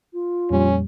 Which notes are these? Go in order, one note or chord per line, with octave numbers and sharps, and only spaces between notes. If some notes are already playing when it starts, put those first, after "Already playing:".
F4
F2 A#2 G3 C#4